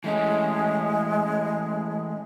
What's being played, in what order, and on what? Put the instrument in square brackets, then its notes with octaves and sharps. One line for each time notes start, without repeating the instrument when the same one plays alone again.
[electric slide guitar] E3 A3 C#4 [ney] G#3